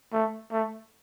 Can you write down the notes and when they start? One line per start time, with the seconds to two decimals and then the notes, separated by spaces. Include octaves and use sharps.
0.13 A3
0.52 A3